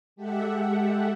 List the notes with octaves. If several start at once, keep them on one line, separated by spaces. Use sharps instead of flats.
G#3 G4 A4 E5 F#5